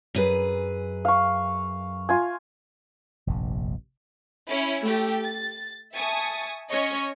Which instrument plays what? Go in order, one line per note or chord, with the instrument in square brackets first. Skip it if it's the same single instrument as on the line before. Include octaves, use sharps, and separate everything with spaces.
[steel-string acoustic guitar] F#2 G#4 B4
[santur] F5 C#6
F4 G#5
[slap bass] F1 A#1 G2
[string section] C#4 E4
A3 G4
A6
E5 G#5 A5 C#6 D#6
C#4 C#5 D#5 C#6